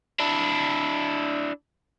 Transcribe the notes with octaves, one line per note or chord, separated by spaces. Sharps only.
D4 E4